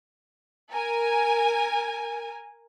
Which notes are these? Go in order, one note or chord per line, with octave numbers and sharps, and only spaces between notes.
A#4 G#5